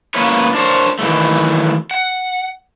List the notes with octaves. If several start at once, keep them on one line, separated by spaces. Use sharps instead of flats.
A#3 B3 C#4 E4 B4 C#5
D4 A#4 C5 C#5
D#3 E3 F#3 A3
F#5